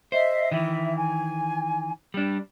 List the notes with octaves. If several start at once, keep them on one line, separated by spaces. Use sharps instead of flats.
C5 D#5 E5
D#3 E3 E5
G#5
G3 D4